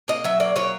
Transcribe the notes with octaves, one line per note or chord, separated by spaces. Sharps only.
A#3 D#5
F#3 E5
A#3 D5
F#3 C#5